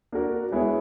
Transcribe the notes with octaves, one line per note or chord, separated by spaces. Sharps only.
A#3 D4 F#4 A#4
G#3 B3 E4 G#4 C#5